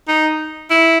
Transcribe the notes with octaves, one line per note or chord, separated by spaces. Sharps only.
D#4
E4